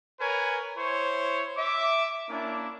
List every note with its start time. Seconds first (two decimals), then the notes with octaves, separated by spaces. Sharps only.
0.20 A#4 B4 C#5 G#5
0.77 E4 C5 C#5
1.57 E5 D6
2.30 A#3 C#4 D4 E4